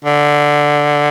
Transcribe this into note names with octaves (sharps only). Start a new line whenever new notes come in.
D3